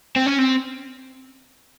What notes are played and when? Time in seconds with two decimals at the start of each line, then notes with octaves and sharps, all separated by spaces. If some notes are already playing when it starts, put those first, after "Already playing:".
0.16 C4
0.26 C#4
0.39 C4